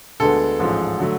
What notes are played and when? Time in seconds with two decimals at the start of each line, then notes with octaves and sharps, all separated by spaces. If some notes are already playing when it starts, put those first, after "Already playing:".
0.20 D2 D3 G#3 B3 A4
0.59 A1 G#2 F3 G#3
0.99 D3 F#3 A3